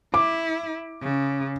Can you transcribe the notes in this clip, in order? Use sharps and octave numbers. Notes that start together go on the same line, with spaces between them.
E4 D6
C#3